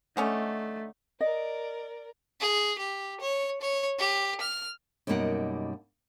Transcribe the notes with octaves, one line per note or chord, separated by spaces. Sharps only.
D3 A3 C#4 D#4
A#4 D5 D#5
G#4
G4
C#5
C#5
G4
F6
F#2 B2 G3 A#3 D#4 F#5